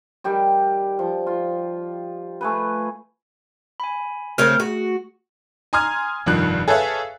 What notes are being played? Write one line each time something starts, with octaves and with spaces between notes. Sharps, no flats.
D#3 G3 G4 D5
F3
F4
A3 G#4 B4
G#5 B5
C#3 A3 C4 A#4 F6
F#4 G#4
G#5 A#5 C6 D#6 F6 G#6
F1 G2 D#3 F3 F#6
G#4 A4 B4 C#5 E5 F5